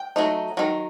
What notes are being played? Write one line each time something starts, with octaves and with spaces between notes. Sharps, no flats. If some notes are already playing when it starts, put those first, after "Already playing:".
Already playing: G5
F#3 A3 D#4
D#3 F#3